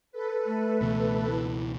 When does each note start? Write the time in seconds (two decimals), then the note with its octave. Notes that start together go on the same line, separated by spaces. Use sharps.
0.12 A4 B4
0.46 A3
0.81 C#2 B2 E3
1.30 E4